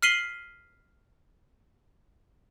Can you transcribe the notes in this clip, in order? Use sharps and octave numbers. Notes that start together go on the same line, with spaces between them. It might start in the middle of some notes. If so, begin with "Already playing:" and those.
F6 B6 C7 D#7 F#7 G7